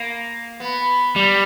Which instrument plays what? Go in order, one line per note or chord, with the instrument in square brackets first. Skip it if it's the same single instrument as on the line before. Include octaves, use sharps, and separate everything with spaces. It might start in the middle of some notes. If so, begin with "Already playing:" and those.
Already playing: [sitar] A#3
B3
[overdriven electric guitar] G3